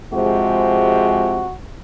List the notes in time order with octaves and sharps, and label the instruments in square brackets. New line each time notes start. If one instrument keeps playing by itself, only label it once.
[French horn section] C3 F3 G#3 [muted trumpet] F#4